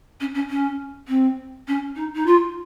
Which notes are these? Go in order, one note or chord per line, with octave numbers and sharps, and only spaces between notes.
C#4
C#4
C#4
C4
C#4
D#4
D#4
F4